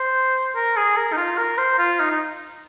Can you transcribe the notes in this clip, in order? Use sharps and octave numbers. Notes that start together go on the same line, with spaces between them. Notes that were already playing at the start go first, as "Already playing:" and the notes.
Already playing: C5
A#4
G#4
A#4
D#4
F4
A#4
C5
F4
D#4
D#4